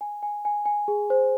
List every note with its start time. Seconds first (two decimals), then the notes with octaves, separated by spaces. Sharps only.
0.01 G#5
0.23 G#5
0.45 G#5
0.66 G#5
0.88 G#4
1.10 C5